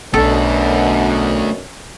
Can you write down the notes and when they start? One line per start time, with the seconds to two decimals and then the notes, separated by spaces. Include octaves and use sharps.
0.14 B1 F#2 B2 A3 B3 D4 A4